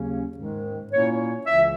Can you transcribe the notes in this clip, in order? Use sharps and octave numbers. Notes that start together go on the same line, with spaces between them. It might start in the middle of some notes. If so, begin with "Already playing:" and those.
Already playing: D#2 C#3 F#3 A#3 C#4
G#2 D#3 G#3
A#2 A#3 C#4 E4 C#5
C#2 C#3 E3 E5